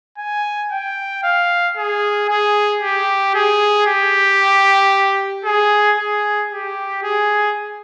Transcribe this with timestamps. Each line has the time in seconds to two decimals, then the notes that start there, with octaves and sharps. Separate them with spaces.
0.18 G#5
0.72 G5
1.23 F5
1.77 G#4
2.29 G#4
2.82 G4
3.35 G#4
3.87 G4
5.45 G#4
5.98 G#4
6.51 G4
7.03 G#4